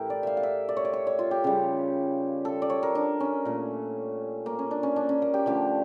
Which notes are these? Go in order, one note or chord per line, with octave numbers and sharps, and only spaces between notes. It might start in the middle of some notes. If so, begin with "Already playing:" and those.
Already playing: A2 E3 A3 E4 G4 A#4
D5
E5 F5
F5
E5
D5
C#5
D5
C#5
C#5
F4
G4
C#3 G3
A4
D5
C#5
A#4
D4
C#4
A#2 A3
A#3
C#4
D4
C#4
D4
C#4
A#3
G4
D3 F3 A3 G4